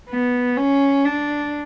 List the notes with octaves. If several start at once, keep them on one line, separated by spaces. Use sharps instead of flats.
B3
C#4
D4